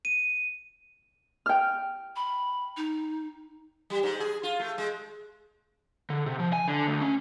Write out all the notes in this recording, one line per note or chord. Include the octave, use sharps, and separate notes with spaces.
D#7
G5 F6
B5
D#4
G3
G#2
G#4
F4
A3
G#3
D3
C3
F3
G#5
D3
D2
C#4